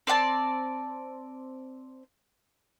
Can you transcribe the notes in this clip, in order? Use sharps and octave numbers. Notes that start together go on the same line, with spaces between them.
C4 D5 G5 A5